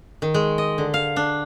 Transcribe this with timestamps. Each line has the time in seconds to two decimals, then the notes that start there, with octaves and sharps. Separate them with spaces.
0.22 D#3
0.34 G#3
0.58 D#5
0.78 D3
0.94 F5
1.16 D4